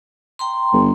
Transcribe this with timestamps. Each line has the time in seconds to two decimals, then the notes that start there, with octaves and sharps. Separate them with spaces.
0.39 G5 A#5 C6
0.73 G1